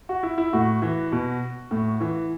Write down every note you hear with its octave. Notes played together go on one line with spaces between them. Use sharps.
F#4
E4
E4
A2 F#4
E3
B2
A2
E3